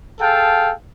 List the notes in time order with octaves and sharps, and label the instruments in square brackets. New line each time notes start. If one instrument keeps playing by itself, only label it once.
[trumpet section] G#4 A4 F5 G5 A5